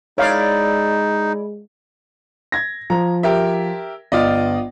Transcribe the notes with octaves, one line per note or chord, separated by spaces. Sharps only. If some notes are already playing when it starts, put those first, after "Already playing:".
G#3 D#4 E4 C#5 D5 F5
G#6 A#6
F3 A#5
G4 A#4 E5
G1 F4 D5 D#5